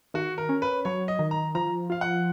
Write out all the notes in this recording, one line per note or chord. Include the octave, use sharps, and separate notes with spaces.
D#3 F#4
A#4
C#4
B4
F#3 C#5
D#5
D#3
A#5
F3 A#5
F4 F5
F#5